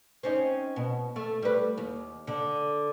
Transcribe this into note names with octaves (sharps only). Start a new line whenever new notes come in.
C4 C#4 D#4
B2
A3
G3 B4
D#2
D3